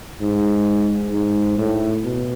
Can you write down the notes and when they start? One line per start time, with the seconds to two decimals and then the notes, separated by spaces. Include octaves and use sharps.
0.21 G#2
1.12 G#2
1.57 A2
2.04 B2